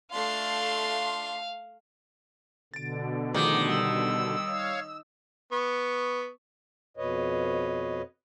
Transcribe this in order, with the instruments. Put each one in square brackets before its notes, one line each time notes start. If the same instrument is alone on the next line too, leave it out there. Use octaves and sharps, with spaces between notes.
[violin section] A3 C7 [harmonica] D4 F4 C6 [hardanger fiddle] F5
[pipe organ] B2 D3 [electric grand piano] A6 D7
[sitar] D#3 [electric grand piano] F3 A3 G#4 [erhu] D6
[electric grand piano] G3 [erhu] E6
[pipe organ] C#5 F5
[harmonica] B3 C#6
[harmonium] F2 B2 B4 C#5 D#5